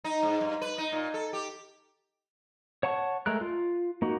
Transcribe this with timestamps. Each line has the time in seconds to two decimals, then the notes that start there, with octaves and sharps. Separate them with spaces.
0.04 D#4
0.23 G#2
0.41 G2
0.62 B4
0.78 D#4
0.92 A#2
1.14 A4
1.33 G4
2.83 C#5 F#5 A5 C#6
3.26 G#3 A3 A#4 F#6
3.41 F4
4.02 A#3 D#4 F#4